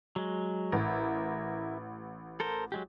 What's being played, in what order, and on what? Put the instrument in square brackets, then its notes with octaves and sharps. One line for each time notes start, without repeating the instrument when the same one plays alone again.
[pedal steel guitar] F#3 G#3
[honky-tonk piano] A1 [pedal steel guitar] E4 A#4
[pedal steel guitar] A4 A#4 C5
F#3 G#3 G4